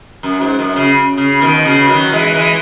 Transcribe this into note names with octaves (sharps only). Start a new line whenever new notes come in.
F#2
G#2
F#2
C#3
C#3
B2 D#3
C#3
D#3 F#3
E3 G#3
E3 G#3